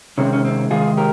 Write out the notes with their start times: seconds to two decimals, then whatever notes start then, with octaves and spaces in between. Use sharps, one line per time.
0.18 C3 D#3 G#3 C4 C#4
0.33 C#4
0.45 C4
0.70 C3 D#3 G#3 F4 G#4
0.97 G4 A#4